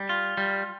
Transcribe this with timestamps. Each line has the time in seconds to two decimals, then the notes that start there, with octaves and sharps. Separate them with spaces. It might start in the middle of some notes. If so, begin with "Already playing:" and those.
Already playing: G3
0.09 F4
0.37 G3